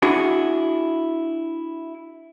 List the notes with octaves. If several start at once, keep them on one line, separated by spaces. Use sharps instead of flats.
D4 E4 F#4 G#4